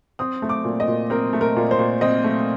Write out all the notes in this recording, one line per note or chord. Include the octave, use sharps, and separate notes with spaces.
C4 D#6
A3
D6
A#2
D#5
A#2
C4 A#4
A3
A#4
A#2
C5
A#2
C4 D#5
A3